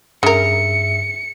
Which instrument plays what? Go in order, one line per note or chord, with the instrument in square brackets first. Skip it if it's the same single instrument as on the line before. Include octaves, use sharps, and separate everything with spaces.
[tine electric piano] G2 G#4 E5 [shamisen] C#3 A#4 [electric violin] C#7